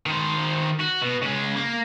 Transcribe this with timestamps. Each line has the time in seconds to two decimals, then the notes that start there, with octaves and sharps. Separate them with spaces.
0.06 D#3 C5
0.80 F#4
1.02 B2
1.23 C#3 G#3
1.56 A#3